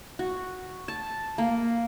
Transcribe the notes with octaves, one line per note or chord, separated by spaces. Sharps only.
F#4
A5
A#3